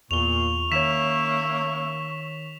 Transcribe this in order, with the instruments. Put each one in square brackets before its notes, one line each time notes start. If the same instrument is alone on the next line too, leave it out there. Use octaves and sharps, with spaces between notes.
[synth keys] E2 [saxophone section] A#2 [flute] C#6 [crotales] F7 G7
[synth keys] D#3 C#5 [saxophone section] A#3 C#4 E5 [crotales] B6 E7